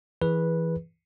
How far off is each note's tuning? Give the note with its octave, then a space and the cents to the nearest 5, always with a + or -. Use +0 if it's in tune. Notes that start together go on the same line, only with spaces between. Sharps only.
E3 +0 G#4 +0 B4 -10